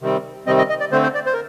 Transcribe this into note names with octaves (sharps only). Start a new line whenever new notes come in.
C3 D#3 G3 C4
C3 D#3 G3 C4 D#5
D#5
D#5
D5
D3 A3 C4 C5
C5
D5
C5
A#4